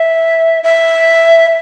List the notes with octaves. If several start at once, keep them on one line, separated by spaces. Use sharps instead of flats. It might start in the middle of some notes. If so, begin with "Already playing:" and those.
Already playing: E5
E5